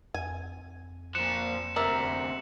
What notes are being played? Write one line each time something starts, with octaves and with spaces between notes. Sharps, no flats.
F2 G#5
A#2 F3 F#6 C#7 E7
D2 C3 A#4 D5 E5 F#7